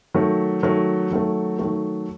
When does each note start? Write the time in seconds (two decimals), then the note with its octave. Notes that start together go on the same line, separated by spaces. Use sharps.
0.14 D#3 F#3 A3
0.63 D#3 F#3 A3
1.11 D#3 F#3 A3
1.59 D#3 F#3 A3